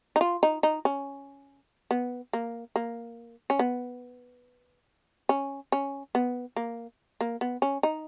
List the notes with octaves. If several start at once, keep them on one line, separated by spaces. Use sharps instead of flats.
D#4
F4
D#4
D#4
C#4
B3
A#3
A#3
C#4
B3
C#4
C#4
B3
A#3
A#3
B3
C#4
D#4